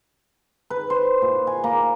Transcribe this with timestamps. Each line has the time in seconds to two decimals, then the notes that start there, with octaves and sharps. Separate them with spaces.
0.70 B4
0.90 C5
1.22 A#2
1.47 G#5
1.64 A#3